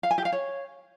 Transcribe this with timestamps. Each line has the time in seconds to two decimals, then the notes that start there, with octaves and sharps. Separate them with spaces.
0.03 F5
0.11 G#5
0.18 G4
0.25 F5
0.32 C#5